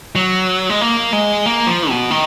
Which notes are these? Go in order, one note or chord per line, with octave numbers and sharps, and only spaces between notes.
F#3
G#3
A#3
G#3
A#3
F3
B2
D#3